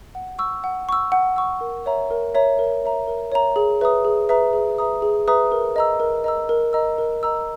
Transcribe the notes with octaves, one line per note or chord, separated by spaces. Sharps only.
F#5
C#6 E6
F#5
C#6 E6
F#5
C#6 E6
A#4
C#5 E5 A#5
A#4
C#5 E5 A#5
A#4
C#5 E5 A#5
A#4
C#5 E5 A#5
G#4
B4 E5 A#5 D#6
G#4
B4 E5 A#5 D#6
G#4
B4 E5 A#5 D#6
G#4
B4 E5 A#5 D#6
A#4
D#5 A#5 E6
A#4
D#5 A#5 E6
A#4
D#5 A#5 E6
A#4
D#5 A#5 E6